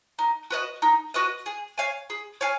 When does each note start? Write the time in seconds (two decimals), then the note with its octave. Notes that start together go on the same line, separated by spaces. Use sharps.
0.19 D#4
0.50 F#4 B4 D#5
0.82 D#4
1.14 F#4 B4 D#5
1.46 G#4
1.78 C#5 F5 G#5
2.10 G#4
2.41 C#5 F5 G#5